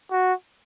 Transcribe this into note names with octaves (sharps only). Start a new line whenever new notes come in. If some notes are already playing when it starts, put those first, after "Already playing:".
F#4